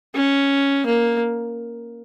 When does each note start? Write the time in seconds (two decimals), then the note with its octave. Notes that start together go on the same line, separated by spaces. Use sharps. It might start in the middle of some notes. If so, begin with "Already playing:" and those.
0.15 C#4
0.86 A#3